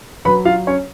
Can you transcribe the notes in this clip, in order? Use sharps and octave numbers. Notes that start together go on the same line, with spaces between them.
F#3 B4 B5
F4 F5
C#4 C#5